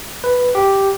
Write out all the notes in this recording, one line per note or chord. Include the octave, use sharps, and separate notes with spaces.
B4
G4